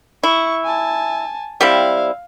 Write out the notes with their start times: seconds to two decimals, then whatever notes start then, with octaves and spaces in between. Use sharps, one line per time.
0.23 E4 C#6
0.65 G#5 A5
1.61 G3 C4 E4 F5